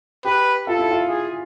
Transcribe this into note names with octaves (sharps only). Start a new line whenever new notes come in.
G4 B4
F4 A4
E4
F4
G#4